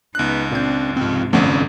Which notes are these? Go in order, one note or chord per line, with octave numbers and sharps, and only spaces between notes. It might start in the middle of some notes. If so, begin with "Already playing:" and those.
C#2 B3 D#4 F#6
A#2 C4 D4 G6
G#2 C3 C4 F4
G1 F2 D3 F3 A3 B3 C#4 D5